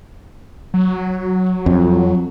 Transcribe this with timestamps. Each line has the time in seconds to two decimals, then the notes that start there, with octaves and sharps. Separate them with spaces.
0.74 F#3
1.66 F2